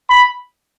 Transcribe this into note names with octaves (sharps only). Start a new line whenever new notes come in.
B5